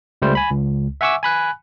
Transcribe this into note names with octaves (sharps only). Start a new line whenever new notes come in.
C#2 G3 A3 C5
G#5 B5
C#2
E5 F#5 G#5 C#6 D6 E6
G#5 B5 F#6